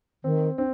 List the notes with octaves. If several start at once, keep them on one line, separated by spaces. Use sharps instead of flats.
D#3 C4
C4 D4